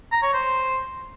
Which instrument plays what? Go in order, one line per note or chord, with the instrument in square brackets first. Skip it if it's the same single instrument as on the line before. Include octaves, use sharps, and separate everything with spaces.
[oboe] A#5
C#5
C5